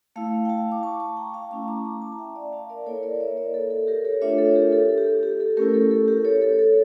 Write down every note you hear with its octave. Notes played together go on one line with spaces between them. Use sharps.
A3 E4 F5 A5
G5
F5 A5
D6
A5 C#6
A5 C#6
G5 A#5
F5 A5
A3 C#4 E4 A5 C#6
A#5 D6
A#5 D6
A5 C#6
A5
E5 G5
D5 F5
F5 A5
A#4 D5
A#3 E4 A4 C#5
A#4 D5
C#5 E5
A#4 D5
A4
A4
G4 A#4
A4 C#5
A3 D4 F4 C#5 E5
A4 C#5
G4 A#4
A4
G4
A4
G4
A4
A3 C#4 E4 G4 A#4
A4
A4
G4 A#4
A4 C#5
A4 C#5
A4